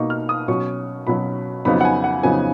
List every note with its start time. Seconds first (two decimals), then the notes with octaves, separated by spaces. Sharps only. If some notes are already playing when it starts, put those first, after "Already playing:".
Already playing: B2 A#3 D#4 C#6
0.10 F6
0.29 D#6
0.48 B2 F#3 C#4 C#6
1.07 B2 F#3 C#4 B5
1.65 F2 C#3 F#3 B3 D#4 B5
1.81 F#5
1.85 G#5
2.04 F#5
2.23 F2 C#3 F#3 B3 D#4 G#5